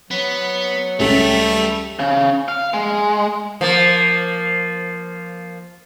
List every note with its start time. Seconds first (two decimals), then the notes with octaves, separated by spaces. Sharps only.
0.11 F#3 B3
1.00 C#2 G3 A3 G4 F#7
1.99 C#3
2.48 F5
2.74 G#3
3.61 F3 A#3